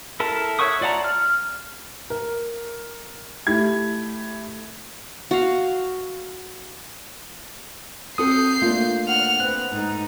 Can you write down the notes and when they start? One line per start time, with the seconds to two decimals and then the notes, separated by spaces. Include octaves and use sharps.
0.20 E4 A4 A#4 A5
0.59 C#5 E5 F#5 C#6 D#6
0.81 F4 D5 F#5 A5 A#5
1.04 F6
2.10 A#4
3.47 A3 E4 G4 G#6
5.31 F#4 F5
8.18 C4 F#4 A4 D#6 G6 C7
8.62 A3 A#3 D4 F4
9.08 F#5 F6
9.40 B3 C4 F#6
9.72 G#2 A3 D#4